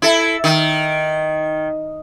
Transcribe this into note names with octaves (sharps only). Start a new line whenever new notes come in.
E4 A4
D#3